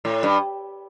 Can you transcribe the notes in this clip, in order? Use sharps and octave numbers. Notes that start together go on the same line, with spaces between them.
A2
G2